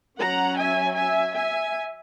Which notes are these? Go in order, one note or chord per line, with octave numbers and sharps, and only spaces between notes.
F#3 C#4 F#5 A#5
E5 G#5
E5 G#5
E5 G#5